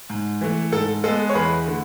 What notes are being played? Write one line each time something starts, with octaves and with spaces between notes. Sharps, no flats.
G#2
E3 A3
G#2 A4
G#3 B3 A4
C#5
E2 G#4 B4
D3 A3